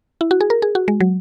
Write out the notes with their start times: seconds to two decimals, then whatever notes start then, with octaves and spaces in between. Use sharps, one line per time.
0.21 E4
0.31 F#4
0.41 G#4
0.50 A#4
0.62 G#4
0.75 F#4
0.88 G#3
1.00 F#3